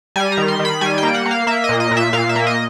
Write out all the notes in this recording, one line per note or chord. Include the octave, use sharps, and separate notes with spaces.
G3 G#5
A#5
D#3
C6
D#3
B5
G3 G#5
G5
A#3
F#5
A#3
F5
A#3 E5
D#5
A#2
D#5
A#2
E5
A#2 F5
E5
A#3
D#5